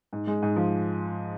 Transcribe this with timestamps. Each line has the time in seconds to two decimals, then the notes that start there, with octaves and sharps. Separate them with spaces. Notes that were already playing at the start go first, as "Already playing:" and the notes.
0.13 G#2
0.27 G#3
0.42 G#2
0.56 F3